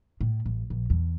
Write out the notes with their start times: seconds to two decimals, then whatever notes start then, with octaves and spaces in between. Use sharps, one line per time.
0.21 A2
0.46 A1
0.70 A#1
0.90 E2